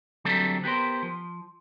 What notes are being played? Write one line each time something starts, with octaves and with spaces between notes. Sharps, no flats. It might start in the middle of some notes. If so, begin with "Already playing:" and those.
D3 F#3 G3 A3 C4 A4
B3 G4 G#4 A#4 C5
F3